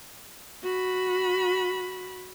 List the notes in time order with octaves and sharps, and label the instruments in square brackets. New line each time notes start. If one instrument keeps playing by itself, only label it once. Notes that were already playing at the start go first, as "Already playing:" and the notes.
[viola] F#4 B5